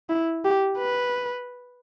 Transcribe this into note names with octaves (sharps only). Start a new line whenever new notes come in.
E4
G4
B4